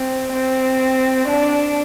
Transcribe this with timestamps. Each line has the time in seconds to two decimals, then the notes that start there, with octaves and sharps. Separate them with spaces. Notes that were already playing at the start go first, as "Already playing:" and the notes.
Already playing: C4
0.33 C4
1.28 D4